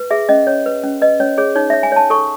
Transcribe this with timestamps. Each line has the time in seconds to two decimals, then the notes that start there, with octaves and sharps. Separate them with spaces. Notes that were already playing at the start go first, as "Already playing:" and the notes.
Already playing: B4
0.11 G#4 E5
0.29 C#4 D#5
0.47 C#4 C#5
0.66 B4
0.83 C#4
1.02 B4 D#5
1.20 C#4 C#5
1.38 G#4 C#5
1.56 D#4 C#5
1.70 C#5 E5
1.83 G#5
1.92 C#5 A5
2.10 A4 C#6